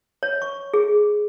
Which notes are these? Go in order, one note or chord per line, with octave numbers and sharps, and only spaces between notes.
C#5
C#6
G#4